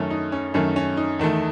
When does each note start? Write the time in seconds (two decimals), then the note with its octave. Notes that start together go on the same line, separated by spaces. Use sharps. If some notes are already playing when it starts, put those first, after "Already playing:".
Already playing: F#2 D#3 A3 C#4
0.10 D#4
0.32 C#4
0.54 F#2 D#3 A3 C#4
0.76 C#4
0.97 D#4
1.19 E2 D#3 A3